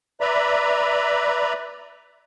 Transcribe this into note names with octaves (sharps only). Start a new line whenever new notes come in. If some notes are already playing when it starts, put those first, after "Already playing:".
B4 D5 E5 A#5 B5